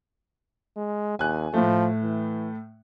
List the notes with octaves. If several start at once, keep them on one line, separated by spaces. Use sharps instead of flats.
G#3
D#2 G#5 F#6
A2 F3 A3
E3